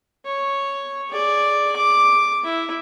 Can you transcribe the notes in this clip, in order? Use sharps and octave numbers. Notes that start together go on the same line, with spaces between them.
C#5
G#4 D5
D6
E4